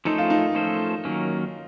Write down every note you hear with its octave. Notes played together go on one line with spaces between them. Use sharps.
F3 A3 C#4 D#4 A4 C5
F4
D#4
F3 A3 C#4 A4 C5
D#3 F#3 A#3 C#4